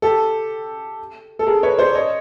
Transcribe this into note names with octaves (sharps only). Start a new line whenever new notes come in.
G4 A4
A4
G#4 A#4
B4 C#5
C5 D5
C#5 D#5